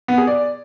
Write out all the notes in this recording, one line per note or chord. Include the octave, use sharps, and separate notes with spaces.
B3
G#4
D5